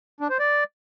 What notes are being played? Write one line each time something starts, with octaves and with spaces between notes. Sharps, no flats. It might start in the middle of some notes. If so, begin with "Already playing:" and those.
D4
C5
D5